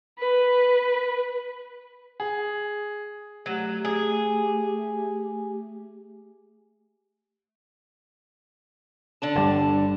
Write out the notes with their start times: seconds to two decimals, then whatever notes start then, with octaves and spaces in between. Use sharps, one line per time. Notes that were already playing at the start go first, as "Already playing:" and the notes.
0.19 B4
2.20 G#4
3.46 F#3 A3 G4
3.85 G#4
9.22 D3 D4 A5
9.36 G1 G3